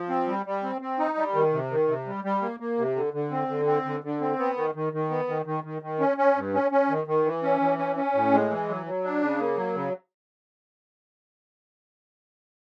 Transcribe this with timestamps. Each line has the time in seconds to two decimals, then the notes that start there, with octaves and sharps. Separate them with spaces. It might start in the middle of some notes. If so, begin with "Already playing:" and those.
Already playing: F3
0.09 C4
0.28 G3
0.46 G3
0.63 C4
0.82 C4
0.99 D#4
1.17 G3
1.34 D#3
1.53 C3
1.71 D#3
1.88 C3
2.06 G3
2.24 G3
2.42 A#3
2.60 A#3
2.78 C3
2.96 D3
3.13 D3
3.31 C4
3.49 D3
3.67 C4
3.85 D3
4.04 D3
4.21 C4
4.39 B3
4.57 D#3
4.75 D#3
4.93 D#3
5.10 B3
5.28 D#3
5.46 D#3
5.64 D#3
5.82 D#3
6.00 C#4
6.18 C#4
6.36 G2
6.54 C#4
6.71 C#4
6.89 D#3
7.07 D#3
7.25 E3
7.43 C#4
7.61 E3
7.78 C#4
7.96 C#4
8.14 A2
8.32 G#3
8.50 E3
8.69 F#3
8.86 F#3
9.05 D4
9.22 C#3
9.40 A#3
9.57 F#3
9.75 C#3